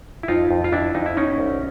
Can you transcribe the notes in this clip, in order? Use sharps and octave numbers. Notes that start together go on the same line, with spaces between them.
E4
F2 D#4 F4
F2
F4
F2 D4 E4
F2 D#4
E4
B2 C#4 D#4
C2